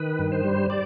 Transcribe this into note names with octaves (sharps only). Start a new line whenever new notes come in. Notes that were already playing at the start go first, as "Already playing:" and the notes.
Already playing: D#3 B4
G2
C5
G3
D5